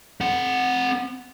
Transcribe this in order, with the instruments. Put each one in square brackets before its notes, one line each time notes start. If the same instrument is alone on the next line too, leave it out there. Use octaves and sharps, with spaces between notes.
[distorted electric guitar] C4 F#5